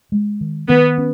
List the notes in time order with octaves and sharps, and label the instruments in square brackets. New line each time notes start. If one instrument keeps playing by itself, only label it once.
[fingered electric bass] G#3
D#3
[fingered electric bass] D#3 [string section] B3
[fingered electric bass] C#4